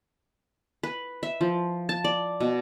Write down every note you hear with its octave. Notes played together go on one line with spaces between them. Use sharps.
B4
E5
F3
A5
D5
B2